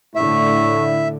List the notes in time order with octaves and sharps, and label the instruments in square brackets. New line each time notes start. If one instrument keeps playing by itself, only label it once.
[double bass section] A2 D3 [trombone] E4 [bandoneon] E5 [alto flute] C#6